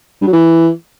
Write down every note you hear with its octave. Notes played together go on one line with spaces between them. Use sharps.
G2
F#3
E3